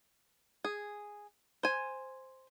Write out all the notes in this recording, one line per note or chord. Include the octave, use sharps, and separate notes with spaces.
G#4
C5 G#5